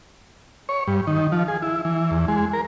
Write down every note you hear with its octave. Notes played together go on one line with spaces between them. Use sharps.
C#5
G2
D#3
F3
G#4
E4
E3
E2
G#3
A#4